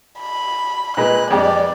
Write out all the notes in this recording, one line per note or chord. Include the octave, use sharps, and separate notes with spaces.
B5
A#2 G#3 B4 F#6
F2 G#3 G4 D5